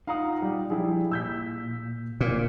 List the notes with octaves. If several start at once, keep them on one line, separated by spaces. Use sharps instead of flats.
D#4 F4 F5 F#5 A#5 D#6
G3 G4
F3 G3 E4 G#4
A#2 E6 G6 B6
A#2